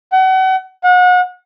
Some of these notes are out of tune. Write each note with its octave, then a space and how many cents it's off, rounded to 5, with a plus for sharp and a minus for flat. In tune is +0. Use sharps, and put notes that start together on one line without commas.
F#5 +35
F#5 -35